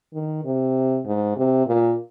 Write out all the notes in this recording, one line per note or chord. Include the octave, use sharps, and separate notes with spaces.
D#3
C3
G#2
C3
A#2